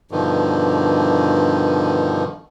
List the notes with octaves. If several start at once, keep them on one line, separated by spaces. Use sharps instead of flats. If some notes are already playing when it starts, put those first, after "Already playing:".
G2 B2 D3 D#3 F3